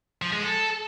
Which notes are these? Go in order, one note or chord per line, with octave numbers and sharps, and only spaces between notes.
F3
G#3
A4